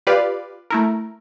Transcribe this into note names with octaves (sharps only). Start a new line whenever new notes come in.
F4 G4 B4 D5 F5
A3 E4 A#4